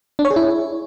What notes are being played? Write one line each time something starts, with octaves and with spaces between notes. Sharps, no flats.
D4
C#5
G#4
E4